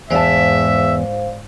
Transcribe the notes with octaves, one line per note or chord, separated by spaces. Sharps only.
E2 G#2 C5 D5 E5 F5 A5